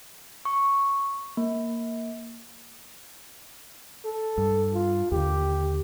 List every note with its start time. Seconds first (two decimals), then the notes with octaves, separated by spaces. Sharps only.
0.45 C#6
1.37 A#3
4.05 A4
4.38 G2
4.74 F4
5.12 D#2 D3 G4